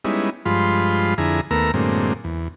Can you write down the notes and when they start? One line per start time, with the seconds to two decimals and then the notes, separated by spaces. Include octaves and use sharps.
0.05 G3 G#3 B3 C#4 D#4 E4
0.46 G2 F3 G#3 F4 B5 C6
1.18 F2 D3 E4 G#4 A#5
1.51 D#2 A3 B3 A#4 A#5 E6
1.74 F#2 A2 D3 G#3 A#3 C4
2.24 E2